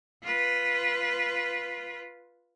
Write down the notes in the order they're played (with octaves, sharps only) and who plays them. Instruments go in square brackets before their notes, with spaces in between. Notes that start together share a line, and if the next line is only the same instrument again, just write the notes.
[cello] F4 B4